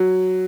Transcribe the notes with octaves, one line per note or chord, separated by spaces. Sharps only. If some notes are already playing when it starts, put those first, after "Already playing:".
Already playing: F#3